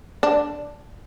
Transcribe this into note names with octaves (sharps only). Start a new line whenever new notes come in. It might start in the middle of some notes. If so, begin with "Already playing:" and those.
D4